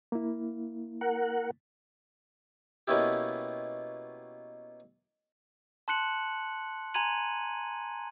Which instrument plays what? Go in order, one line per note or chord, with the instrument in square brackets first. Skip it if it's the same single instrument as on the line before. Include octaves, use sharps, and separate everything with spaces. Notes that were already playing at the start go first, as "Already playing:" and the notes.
[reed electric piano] A#3 E4
[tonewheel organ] A#4 F#5
[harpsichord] B2 A#3 B3 C#4 E4 G4
[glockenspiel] A5 C6 F#6 C#7 F#7
G#5 A#5 C6 G#6 D#7 F#7